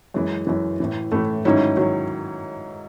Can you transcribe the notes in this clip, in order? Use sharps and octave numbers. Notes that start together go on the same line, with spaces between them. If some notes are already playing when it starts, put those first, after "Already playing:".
F#2 E3 G#3
F#2 E3
A2 E3
A2 E3 A3
G#2 D#3 F#3 C#4 E4
D#3 F#3